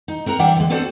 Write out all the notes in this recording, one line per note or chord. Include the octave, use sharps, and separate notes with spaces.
D#4
C4 A#4 F#5 A#5
E3 G3 D4 E5 F#5 G5
D3 G#3
B3 C4 D4 F#4 A4 C5